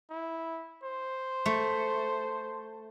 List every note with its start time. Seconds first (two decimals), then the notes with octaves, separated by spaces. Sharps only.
0.10 E4
0.83 C5
1.46 A3